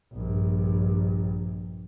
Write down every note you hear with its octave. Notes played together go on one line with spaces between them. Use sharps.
A#1 G2